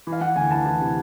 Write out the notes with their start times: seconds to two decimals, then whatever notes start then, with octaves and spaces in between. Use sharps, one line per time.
0.07 E3
0.12 F5
0.21 E3 F#5
0.36 D2 G#5
0.51 E3 A5
0.66 E3 A5
0.81 C3